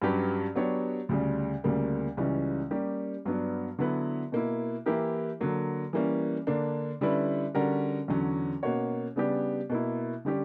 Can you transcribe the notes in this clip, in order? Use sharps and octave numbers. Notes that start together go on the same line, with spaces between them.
G2 F#3 C#4 G4 B4
F#3 B3 D4 G4 C#5
D2 C#3 G3
D2 C#3 G3 A#3
C#2 C#3 E3 G3 C#4
G3 A#3 C#4 G4
G2 F#3 B3 D4
D3 F#3 B3 E4 B4
B2 A#3 E4
E3 A#3 E4 G4 A#4
D3 F#3 A#3
E3 G3 A#3 C#4
D3 A#3 D4
D3 G3 C#4 E4 B4
D3 G3 C#4 F#4 A#4
E2 D3 F#3 C#4
B2 A#3 C#4 F#4 C#5
C#3 G3 B3 D4 G4
B2 A#3 E4
D3 G3 C#4 G4